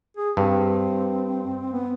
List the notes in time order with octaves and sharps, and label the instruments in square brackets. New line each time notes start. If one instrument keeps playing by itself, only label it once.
[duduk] G#4
[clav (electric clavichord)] G2 [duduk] C4
[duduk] B3